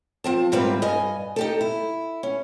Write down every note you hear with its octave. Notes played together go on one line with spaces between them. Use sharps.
F3 C4 A5
G#2 E3 G3 A#3 C4 B4
G2 D#5 G#5
D#4 G4 A4
E4
C#4